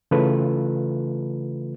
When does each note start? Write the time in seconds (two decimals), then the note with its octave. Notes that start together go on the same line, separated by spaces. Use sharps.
0.11 C#3 E3 A3 F4 A4 B4